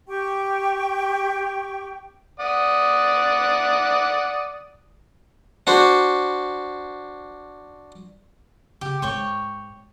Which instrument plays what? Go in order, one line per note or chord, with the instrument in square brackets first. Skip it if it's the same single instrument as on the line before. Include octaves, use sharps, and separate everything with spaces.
[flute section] G4 G5 C#6
[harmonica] D5 F#5 D#6
[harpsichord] D4 F#4 C5
[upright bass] C#3 [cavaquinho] G4
[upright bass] G#2 C4 [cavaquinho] C#5 G5 C#6